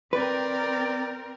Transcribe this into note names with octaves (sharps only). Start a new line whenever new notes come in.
C4 A#4 B4 D5 G5